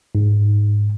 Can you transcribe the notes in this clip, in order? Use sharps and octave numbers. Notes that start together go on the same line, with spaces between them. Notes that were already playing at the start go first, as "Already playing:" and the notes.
G#2